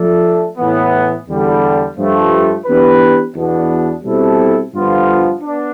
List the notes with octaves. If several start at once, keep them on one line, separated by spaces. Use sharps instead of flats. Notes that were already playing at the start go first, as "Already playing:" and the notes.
Already playing: F3 A3 D4 A4
A2 E3 B3
E2 D3 G3
G2 F3 A3
E3 B3 D4 G4 B4
E2 B2 B3 D4
B2 G3 C4 E4 A4
G2 D3 F3 B3 F4
B3 D4